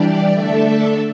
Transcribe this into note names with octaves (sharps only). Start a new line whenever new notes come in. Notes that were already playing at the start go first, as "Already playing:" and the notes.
Already playing: E3 G3 D4 G4 D5
D3 A3 D4 A4 E5